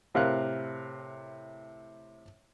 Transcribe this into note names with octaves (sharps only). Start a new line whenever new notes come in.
A2 C3 A#4 F5 F#6